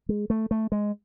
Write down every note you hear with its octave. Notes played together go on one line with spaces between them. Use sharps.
G#3
A3
A3
G#3